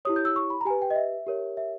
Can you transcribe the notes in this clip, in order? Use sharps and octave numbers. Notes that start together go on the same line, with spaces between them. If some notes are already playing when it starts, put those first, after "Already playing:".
E4 G4 C#5 D#6
G6
E6
C#6
B5
A#5
G4 B4 G#5
G5
D#5
E5
G4 A#4 C#5
E5